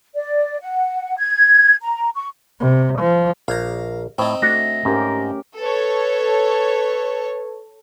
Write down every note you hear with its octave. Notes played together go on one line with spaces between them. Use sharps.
D5
F#5
G#6
A#5
C#6
C3
F3
A#1 F5 A#5
A2 C4 D#4
A3 D4 F#4 A#6
G#2 C#4 G4 A#4
A4 B4 C#5